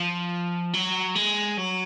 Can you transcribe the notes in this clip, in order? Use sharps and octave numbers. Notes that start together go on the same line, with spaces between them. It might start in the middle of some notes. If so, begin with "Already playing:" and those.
Already playing: F3
F#3
G#3
F#3